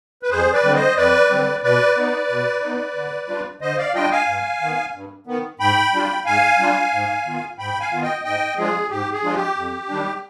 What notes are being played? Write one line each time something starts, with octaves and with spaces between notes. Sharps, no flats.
B4
F2 G#4 C5
B4 D5
D3 G3 C4
C5 D#5
F2 B4 D5
D3 G3 C4
B2 B4 D5
B3 D#4
B2
B3 D#4
D3
G3 D4 F4
D3 C5 D#5
D5 F5
G3 D4 F4 D#5 G5
F5 G#5
G2
D#3 B3
G2
D#3 B3
G#2 G5 B5
G3 D4 F4
G#2 F5 G#5
G3 D4 F4
G#2
D#3 B3 F4
G#2 G5 B5
F5 G#5
D#3 B3 F4
D#5 G5
G#2 D#5 G5
F3 G#3 D4 F4 G#4
G#2 G4
G#4
F3 G#3 D4 F4
G4
F2
D#3 G3 D4